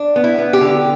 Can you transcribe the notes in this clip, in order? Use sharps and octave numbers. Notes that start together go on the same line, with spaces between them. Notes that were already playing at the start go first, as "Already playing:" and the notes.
Already playing: D4
B3
E4
B3
G4
D3